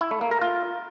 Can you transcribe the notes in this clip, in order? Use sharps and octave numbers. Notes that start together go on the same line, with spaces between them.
E4
A3
A#3
A#4
F4